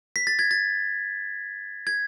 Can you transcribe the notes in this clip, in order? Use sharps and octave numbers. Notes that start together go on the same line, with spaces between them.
B6
A6
G#6
A6
G#6